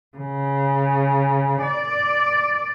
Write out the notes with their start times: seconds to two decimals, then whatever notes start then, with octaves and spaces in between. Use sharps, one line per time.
0.18 C#3
1.62 D5